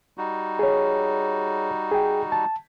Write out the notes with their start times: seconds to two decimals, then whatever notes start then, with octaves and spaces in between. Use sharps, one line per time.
0.18 G3 D#4 F#4
0.59 G#4 C#5
1.91 G#4 G5
2.32 A5